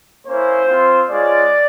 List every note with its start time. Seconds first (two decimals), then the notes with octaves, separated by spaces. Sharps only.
0.27 A#3 C#4 E4 C5
0.68 C4 F4
1.10 G#3 C#4 F4 D5